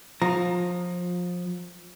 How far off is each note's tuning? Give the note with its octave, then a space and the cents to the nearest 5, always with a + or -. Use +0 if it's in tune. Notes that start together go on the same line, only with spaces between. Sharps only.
F3 +25 A#5 +0